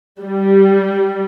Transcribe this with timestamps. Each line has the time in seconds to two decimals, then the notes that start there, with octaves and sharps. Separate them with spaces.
0.21 G3